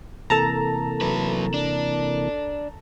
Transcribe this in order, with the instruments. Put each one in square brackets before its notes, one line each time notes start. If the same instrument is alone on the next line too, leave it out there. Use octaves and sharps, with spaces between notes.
[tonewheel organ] C3 E3 A#3 [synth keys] A4 A5 A#5
[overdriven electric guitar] F#3 B4
D4